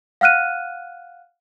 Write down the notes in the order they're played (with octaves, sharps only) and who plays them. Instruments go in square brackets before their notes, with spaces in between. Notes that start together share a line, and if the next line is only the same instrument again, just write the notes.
[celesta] F5 F#5 F6 F#6 D#7